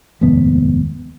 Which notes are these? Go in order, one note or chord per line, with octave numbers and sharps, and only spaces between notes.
F1 D#2 G#2 B3